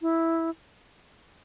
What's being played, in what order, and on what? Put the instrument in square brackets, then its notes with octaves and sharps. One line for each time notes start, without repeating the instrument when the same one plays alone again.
[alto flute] E4